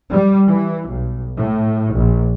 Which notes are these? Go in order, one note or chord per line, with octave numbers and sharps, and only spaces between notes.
G3
E3
B1
A2
A#1